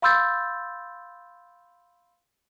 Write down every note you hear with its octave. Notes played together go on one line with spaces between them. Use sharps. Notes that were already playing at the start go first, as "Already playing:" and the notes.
F5 B5 C6 E6 G6 A6